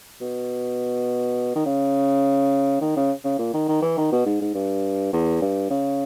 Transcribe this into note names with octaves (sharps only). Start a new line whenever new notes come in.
B2
D#3
C#3
D#3
C#3
C#3
A#2
D#3
D#3
E3
D#3
B2
G#2
G#2
G2
E2
G2
C#3